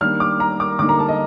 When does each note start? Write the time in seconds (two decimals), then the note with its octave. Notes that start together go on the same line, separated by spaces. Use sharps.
0.01 D#3 G3 A#3 D4 F6
0.20 D6
0.40 A#5
0.60 D6
0.79 D3 G3 A#3 D#4 D6
0.89 A#5
0.99 A5
1.09 D#5